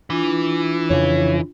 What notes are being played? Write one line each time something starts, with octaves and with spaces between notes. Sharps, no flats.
E3 D4 F4
F2 C#3 C#5